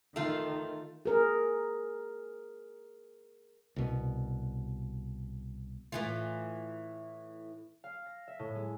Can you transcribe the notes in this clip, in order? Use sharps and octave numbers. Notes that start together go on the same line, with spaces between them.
D#3 A3 F4
G#4 A#4
C2 B2
A2 E3 F4
F5
A#6
E5
A2
G#3